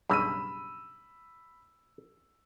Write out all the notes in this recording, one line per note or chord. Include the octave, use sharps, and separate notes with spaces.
B1 G2 C#3 B5 E6 D#7